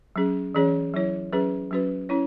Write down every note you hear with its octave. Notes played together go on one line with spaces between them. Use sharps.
F#3 C#4 G#4
E3 C#4 G#4 C#5
F#3 E4 C#5
F#3 C#4 G#4 B4
F#3 C#4 F#4 B4
C#4 E4 C#5